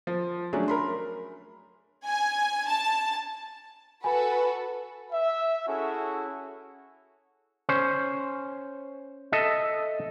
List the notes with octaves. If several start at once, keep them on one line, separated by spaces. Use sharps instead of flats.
F3
F#3 A3 C#4 D4 G#4
A#4 B5 C6
G#5
A5
F#4 A4 B4 G#5 B5
E5
C#4 E4 F#4 G#4 A4
C#4 C5
A4 D#5 E5